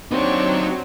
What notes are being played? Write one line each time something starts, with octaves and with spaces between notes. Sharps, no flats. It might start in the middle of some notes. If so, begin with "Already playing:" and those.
F#3 C4 D4 D#4 G4 C#5 C#6